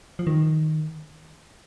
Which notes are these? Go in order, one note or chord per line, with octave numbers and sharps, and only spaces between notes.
F3
D#3